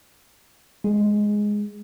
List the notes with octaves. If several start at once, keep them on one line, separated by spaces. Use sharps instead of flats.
G#3